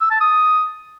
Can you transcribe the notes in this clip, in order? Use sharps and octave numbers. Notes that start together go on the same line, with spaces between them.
E6
A5
D#6